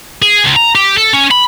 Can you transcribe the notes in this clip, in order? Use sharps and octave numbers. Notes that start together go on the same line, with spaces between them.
G#4
C#2
A#5
G4
A4
C#4
B5